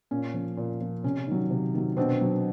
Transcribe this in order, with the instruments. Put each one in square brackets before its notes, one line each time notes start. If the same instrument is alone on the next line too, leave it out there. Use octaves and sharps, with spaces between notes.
[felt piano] A#2 C#4
F3
A#2
F3
C3 C#4
D#3 F#3
C3
D#3 F#3
B2 C4 D4
F#3